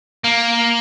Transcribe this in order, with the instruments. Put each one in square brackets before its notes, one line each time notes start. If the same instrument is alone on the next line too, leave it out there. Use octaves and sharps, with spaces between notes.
[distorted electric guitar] A#3